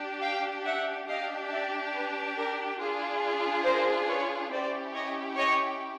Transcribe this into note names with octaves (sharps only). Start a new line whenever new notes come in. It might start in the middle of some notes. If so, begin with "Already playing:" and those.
Already playing: D4 G4
F5 G5
E5 F#5
D4 G4 D#5 F5
D5 E5
B4
A#4
D4 F4 G#4
A#4 C5
B4 C#5
C#4 E4 G4 C5 D5
C#5 D#5
C#5 D#5